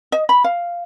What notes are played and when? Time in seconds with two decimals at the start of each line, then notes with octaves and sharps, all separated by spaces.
0.12 D#5
0.29 B5
0.44 F5